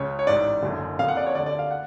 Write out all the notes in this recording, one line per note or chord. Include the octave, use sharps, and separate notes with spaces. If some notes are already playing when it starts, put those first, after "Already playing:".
Already playing: C#2 C#3 C#5
C#5
A1 G#2 D5
F#1 F#2 D3
F#1 F2 C#3 F5
F#5
D5
C#5
D2 D3 D5
D5
F5
F#5